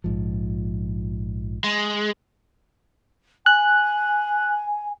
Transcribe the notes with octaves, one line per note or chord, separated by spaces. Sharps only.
A#1 G#2 F3
G#3
G#5 F#6